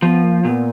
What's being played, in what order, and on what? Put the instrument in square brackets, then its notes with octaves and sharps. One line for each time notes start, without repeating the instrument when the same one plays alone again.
[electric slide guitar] F3 [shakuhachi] B3
[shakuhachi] A#3
[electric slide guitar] A#2 [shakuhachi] B3